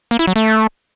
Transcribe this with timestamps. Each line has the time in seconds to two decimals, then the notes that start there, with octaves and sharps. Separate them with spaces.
0.11 A#3
0.19 E4
0.27 F#3
0.36 A3